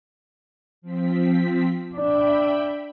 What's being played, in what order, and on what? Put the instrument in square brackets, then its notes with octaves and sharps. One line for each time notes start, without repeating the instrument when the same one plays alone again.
[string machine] F3 C4 B6
[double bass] D4 [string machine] E5 G5 B5